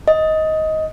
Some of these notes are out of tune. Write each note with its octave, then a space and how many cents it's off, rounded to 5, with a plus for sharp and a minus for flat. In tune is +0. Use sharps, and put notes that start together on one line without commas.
D#5 +15